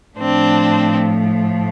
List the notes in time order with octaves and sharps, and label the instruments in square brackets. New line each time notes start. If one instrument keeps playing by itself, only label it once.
[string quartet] A2 F3 A3 C4 D4